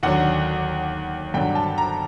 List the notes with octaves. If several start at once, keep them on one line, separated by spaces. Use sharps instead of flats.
D#2 D3 F#3 F#5
G2 D3 F#3 G5
A5
A#5